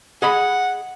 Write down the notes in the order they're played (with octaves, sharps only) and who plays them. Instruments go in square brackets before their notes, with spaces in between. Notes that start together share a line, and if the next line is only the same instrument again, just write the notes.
[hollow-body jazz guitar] G#4 D#5 B5 [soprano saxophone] F#5